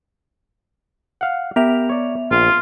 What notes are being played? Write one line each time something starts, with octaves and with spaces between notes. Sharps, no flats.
F5 F#5
B3 G4 A#4 E5 F7
C#5 D5
A#1 F4